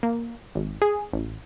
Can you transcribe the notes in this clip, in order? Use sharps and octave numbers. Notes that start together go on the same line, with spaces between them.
A#3
G#1
G#4
A1